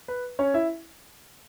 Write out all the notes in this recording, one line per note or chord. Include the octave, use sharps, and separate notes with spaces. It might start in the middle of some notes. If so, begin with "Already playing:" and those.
B4
C#4 C#5
E4 E5